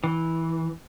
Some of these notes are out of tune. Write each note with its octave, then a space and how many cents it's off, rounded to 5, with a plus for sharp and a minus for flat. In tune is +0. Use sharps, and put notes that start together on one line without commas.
E3 -10